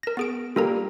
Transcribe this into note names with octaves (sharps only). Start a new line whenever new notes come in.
A#4 A#6
B3 G#4 D7
G3 A#3 F4 A4 A#4 A#5